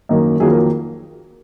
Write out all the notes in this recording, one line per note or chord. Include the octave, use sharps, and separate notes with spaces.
F#2 D#3 A#3
F2 D#3 F#3 A#3 G#4
A#4